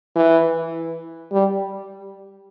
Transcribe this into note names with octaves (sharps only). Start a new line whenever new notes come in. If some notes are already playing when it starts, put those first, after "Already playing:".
E3
G3